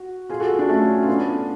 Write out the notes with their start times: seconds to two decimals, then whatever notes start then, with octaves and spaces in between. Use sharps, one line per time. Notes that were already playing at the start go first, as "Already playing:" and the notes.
Already playing: F#4
0.29 F4 G#4
0.40 F#4 A4
0.58 D4 F#4
0.69 A3 C#4
1.03 F4
1.07 B3 D4